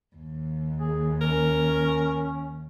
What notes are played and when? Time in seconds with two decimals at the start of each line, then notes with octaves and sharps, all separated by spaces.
0.15 D#2
0.80 G#4
1.21 C#4 A#4